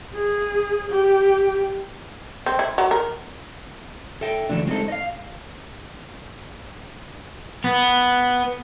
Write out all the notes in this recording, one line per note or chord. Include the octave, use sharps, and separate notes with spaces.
G#4
G4
C4
E4
F#3
A#4
A4 E5 G5
D2 G#2 D3 E3 A3 D4
G#3 C4 D4 D#4 A4
D#5 F5
B3